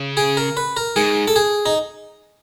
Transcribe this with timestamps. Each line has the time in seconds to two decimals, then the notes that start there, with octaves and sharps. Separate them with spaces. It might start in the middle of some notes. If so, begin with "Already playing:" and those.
Already playing: C#3
0.17 G#4
0.37 A#4
0.57 B4
0.77 A#4
0.96 G#2 G#4
1.28 A4
1.36 G#4
1.66 D#4